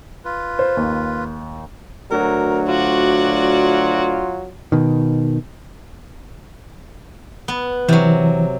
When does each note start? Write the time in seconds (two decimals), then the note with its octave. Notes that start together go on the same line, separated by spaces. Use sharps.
0.25 F4 B4
0.59 C5
0.77 D#2
2.11 D2 F#3 A#4
2.68 F4 F#4 D5
4.72 B2 D#3
7.48 B3
7.89 C3 E3 F#3